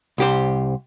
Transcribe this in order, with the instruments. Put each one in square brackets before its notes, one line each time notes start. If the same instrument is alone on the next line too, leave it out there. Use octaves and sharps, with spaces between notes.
[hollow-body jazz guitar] C2 G4 C5